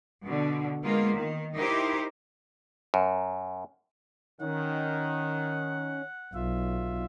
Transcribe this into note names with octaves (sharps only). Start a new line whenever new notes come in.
B2 D3
G#3 A#3 B3 F4
D#3
D#4 E4 G4 A#4 C5
F#2
D#3 C#4 F#5
B1 F4 E5